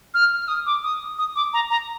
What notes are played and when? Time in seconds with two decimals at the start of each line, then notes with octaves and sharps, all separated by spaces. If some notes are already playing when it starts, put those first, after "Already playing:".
0.14 F6
0.38 F6
0.48 D#6
0.66 D6
0.83 D#6
1.18 D#6
1.36 D6
1.53 A#5
1.70 A#5